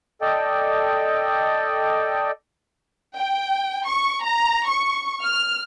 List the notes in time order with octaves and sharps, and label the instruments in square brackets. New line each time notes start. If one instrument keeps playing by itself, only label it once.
[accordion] A4 D5 D#5 G5
[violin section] G5
C#6
A#5
C#6
F6